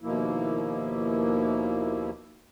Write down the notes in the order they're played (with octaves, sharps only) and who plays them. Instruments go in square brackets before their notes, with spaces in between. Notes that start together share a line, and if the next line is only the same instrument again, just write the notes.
[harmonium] D#2 B2 F3 A#3 E4